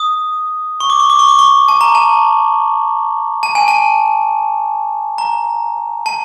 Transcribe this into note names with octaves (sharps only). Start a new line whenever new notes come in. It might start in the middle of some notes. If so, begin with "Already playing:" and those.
Already playing: D#6
C#6
D6
C#6
D6
C#6
D6
C#6
A5
A#5
A5
A5
G#5
A5
A#5
A5